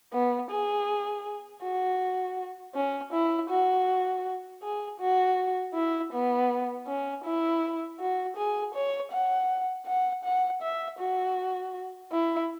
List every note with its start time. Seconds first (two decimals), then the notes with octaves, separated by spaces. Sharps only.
0.13 B3
0.51 G#4
1.62 F#4
2.75 C#4
3.13 E4
3.49 F#4
4.62 G#4
5.00 F#4
5.75 E4
6.13 B3
6.87 C#4
7.24 E4
8.00 F#4
8.36 G#4
8.74 C#5
9.12 F#5
9.86 F#5
10.24 F#5
10.62 E5
10.99 F#4
12.12 E4